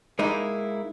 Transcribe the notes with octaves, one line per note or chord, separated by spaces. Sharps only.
G#3 A#3 D#4 E4